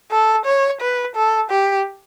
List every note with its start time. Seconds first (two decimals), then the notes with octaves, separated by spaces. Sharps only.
0.11 A4
0.46 C#5
0.81 B4
1.15 A4
1.51 G4